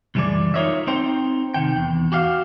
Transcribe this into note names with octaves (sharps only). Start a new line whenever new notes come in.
C#2 F#2 E3 G3 G#4 D5
D#4 F4 A#4 C#5 D#5 E5
C4 D#4 C5 G5
C3 D#3 G5
E2
F#4 G4 F5